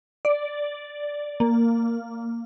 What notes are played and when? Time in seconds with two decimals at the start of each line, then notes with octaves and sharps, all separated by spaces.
0.25 D5
1.40 A#3